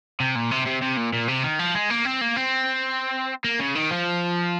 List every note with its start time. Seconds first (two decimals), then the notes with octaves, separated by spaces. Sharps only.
0.20 C3
0.36 A#2
0.51 C3
0.66 C3
0.82 C3
0.97 A#2
1.13 A#2
1.28 C3
1.44 D#3
1.59 F3
1.75 G#3
1.90 A#3
2.05 C4
2.21 A#3
2.36 C4
3.44 A#3
3.59 C#3
3.75 D#3
3.91 F3